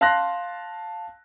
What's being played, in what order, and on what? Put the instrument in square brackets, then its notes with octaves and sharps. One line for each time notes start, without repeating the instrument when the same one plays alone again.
[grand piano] F5 A5 C6 F#6 A#6